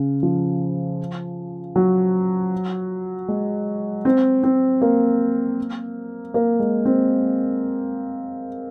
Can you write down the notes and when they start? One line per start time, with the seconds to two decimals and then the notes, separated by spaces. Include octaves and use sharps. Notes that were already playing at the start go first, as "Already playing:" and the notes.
Already playing: C#3
0.23 F3
1.76 F#3
3.28 G#3
4.05 C4
4.43 C4
4.82 A#3
6.34 A#3
6.60 G#3
6.85 C4